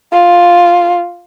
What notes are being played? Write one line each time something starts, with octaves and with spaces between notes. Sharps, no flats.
F4